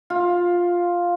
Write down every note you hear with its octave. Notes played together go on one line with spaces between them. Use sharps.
F4